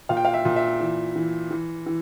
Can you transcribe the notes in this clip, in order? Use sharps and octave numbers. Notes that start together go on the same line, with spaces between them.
A#2 F5
G5
F5
E5
A#2
E5
E3
E3
E3
E3